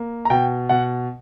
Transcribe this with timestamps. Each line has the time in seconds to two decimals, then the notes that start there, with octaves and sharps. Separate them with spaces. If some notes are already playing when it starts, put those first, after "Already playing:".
Already playing: A#3
0.25 A#5
0.30 B2 G5
0.69 B2 F#5